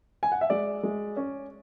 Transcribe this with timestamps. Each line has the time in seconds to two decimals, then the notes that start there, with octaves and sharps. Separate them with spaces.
0.23 G#5
0.32 F#5
0.41 E5
0.50 G#3 D5
0.83 G#3
1.17 C#4